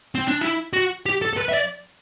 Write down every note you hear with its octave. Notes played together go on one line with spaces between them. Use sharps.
C4
D4
E4
F#4
G4
A4
A4
B4
E5
D5